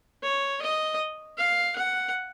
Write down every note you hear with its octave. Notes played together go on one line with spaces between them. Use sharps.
C#5
D#5
F5
F#5